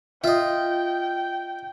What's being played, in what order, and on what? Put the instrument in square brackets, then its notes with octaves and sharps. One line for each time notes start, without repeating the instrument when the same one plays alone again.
[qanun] F4 [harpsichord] D#5 E5 [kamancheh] G5